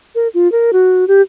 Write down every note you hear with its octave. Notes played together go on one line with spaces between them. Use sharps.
A#4
F4
A#4
F#4
G4